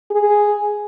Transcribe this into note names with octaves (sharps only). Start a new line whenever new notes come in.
G#4